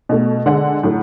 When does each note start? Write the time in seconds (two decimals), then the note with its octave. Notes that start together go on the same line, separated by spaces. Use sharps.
0.09 B2 A3
0.46 D3 G#3 F#5
0.83 A2 F#3 A3